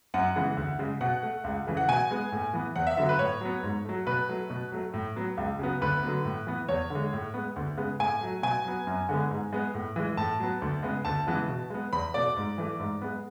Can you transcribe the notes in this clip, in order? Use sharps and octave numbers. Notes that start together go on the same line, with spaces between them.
F#2 F#5
C#3 E3 G#3 B3
D2
C#3 G#3
B2 F#5
A3
C#2
C#3 E3 A3
F#5
B2 G#5
G#3 B3
A2
E3 B3
E2 F#5
E5
D3 F#3 B3 E5
B4
A2 C#5
F#3 B3
G#2
F#3 A3
B2 B4
F#3 A3
B2
F#3 A3
A2
F#3 B3
C#2
C#3 F#3 B3
D2 B4
D3 F#3 B3
A2
E3 B3
E2 C#5
D3
G#3
A2
G#3 B3
D2
C#3 G#3 B3
A2 G#5
F#3 A3
B2 G#5
F#3 B3
F#2
D3 G#3 B3
G#2
G#3 B3
A2
E3 G#3
A2 A5
F#3 B3
D2
C#3 G#3 B3
D2 A5
C#3 E3 G#3 B3
B2
G#3 B3
E2 B5
B2 A3 D5
G#2
E3 A3
G#2
G#3 B3